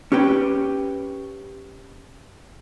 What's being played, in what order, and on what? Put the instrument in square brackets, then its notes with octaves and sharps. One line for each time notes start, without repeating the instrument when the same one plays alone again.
[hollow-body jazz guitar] C#4 G4 B4 G5